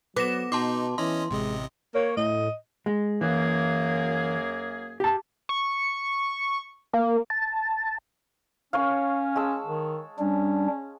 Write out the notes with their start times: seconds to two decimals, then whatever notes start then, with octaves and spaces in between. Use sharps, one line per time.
0.16 F#3 B3 D6 A#6 E7
0.52 B2 D#4 A5 C6 D6
0.98 E3 C#4 D#5 C6
1.31 A1 C3 G#3 D#5
1.95 A#3 C#5
2.17 A2 D#5
2.86 G#3
3.21 F#2 E3 A#3 G#4
5.00 G4 A5
5.49 C#6
6.93 A#3
7.30 A5
8.73 C#4 A#4 C#5 F5
9.36 G#3 A5 E6
9.67 D#3
10.19 G3 C#4 D4